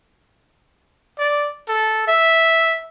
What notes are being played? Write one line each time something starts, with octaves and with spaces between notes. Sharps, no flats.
D5
A4
E5